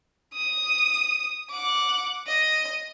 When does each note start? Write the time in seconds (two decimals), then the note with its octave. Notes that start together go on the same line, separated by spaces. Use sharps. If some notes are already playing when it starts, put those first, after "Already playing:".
0.35 D#6
1.51 F#5 D6
2.27 D#5